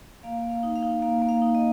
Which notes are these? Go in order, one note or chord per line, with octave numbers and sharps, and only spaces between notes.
A#3 F5
A#3
F5
D#4
F5
D#4
A#3 F5
A#3
F5
D#4
D#5